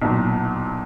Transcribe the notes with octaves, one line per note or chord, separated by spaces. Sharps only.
B1 A#2 F#3